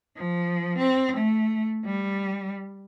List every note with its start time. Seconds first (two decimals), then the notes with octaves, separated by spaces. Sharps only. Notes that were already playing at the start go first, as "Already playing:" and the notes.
0.16 F3
0.79 C4
1.17 A3
1.85 G3